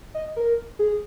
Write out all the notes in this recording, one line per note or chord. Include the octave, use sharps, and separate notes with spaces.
D#5
A#4
G#4